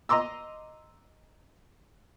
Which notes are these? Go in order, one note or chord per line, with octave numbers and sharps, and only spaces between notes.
D#5 A#5 C6 D6 E6